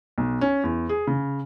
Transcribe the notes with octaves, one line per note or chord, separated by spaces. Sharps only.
B1
C#4
E2
G#4
C#3